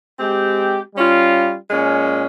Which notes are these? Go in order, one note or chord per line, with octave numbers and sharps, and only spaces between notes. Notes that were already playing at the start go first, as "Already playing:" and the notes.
G#3 C4 G4
G3 C#4 F4
A#2 G#3 C#4